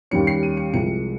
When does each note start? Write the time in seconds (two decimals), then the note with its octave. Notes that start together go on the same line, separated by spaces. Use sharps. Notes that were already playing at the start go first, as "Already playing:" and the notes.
0.11 D#2 D#3 G3 C#4 C#7
0.27 C7
0.43 D#7
0.57 C#7
0.73 C2 C3 F3 G#3 C#7